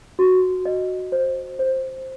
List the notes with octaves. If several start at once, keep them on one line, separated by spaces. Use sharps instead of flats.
F#4
D#5
C5
C5